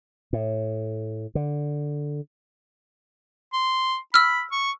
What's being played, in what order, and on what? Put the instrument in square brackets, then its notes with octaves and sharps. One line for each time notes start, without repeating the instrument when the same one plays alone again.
[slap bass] A2
D3
[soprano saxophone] C6
[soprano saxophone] B5 [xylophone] E6 F6
[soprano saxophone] C#6